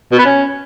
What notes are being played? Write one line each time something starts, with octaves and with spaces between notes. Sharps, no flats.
B2
B3
C#4